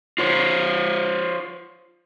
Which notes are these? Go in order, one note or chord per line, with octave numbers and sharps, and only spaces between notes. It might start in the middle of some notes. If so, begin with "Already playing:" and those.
F4 C5 C#5